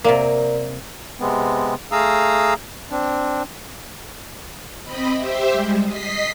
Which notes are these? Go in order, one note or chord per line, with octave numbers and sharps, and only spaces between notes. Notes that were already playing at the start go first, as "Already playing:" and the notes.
C3 A#3 A#4 D5 A#5
C3 G#3 B3 C4
A3 G#4 F5 A#5 D#6 E6
C4 D4
C4 D#5 B5
G4 C5 E5
G3 G#3
D#5 B6 C7